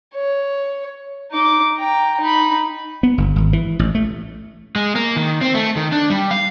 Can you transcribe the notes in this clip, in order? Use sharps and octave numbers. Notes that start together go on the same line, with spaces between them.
C#5
D#4 D6
G5 A#5
D#4 B5
B3
G1
G#1
E3
A1
A3
G#3
A#3
D#3
C4
A3
D#3
D4
G3
F5